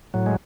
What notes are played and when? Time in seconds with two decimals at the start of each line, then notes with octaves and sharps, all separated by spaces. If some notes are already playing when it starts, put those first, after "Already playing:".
0.14 A2 F#3
0.26 G#3